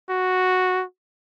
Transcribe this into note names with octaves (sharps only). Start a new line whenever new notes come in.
F#4